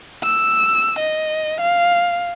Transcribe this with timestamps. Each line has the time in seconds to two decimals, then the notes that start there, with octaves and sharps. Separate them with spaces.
0.24 E6
0.99 D#5
1.61 F5